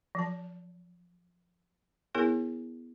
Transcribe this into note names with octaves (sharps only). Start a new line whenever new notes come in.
F3 F#3 A5
B3 E4 G#4 A#4 C#5